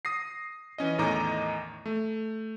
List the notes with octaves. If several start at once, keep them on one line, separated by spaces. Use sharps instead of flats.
D#6 A#6 C7
E3 C#4 D#5
E2 A2 D#3 D#5 A#5 D6
A3